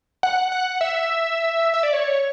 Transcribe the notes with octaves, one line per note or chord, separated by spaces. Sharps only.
F#5
F#5
E5
E5
D5
C#5